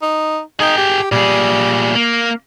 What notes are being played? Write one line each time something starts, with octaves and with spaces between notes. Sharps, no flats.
D#4
D#4 G#4 G5
G4
A#2 G3 G#4
A#3